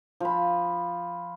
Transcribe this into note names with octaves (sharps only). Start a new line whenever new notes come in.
F3 B5